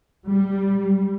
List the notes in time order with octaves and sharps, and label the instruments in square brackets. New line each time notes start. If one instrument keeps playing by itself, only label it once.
[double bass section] G3